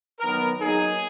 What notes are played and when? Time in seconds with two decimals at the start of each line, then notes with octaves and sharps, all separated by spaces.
0.20 D#3 F#3 B3 A#4
0.61 F#3 A#3 D#4 G#4